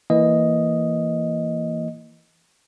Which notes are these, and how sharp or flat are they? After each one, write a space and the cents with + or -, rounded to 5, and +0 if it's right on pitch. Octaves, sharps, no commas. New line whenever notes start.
E3 +0 A#3 -5 D#5 +0